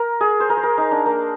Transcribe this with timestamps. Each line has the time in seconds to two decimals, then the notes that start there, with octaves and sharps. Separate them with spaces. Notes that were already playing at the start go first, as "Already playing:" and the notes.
Already playing: A#4
0.21 G#4
0.40 C5
0.50 A#4
0.57 C5
0.63 A#4
0.78 D#4
0.91 D4
1.06 A#3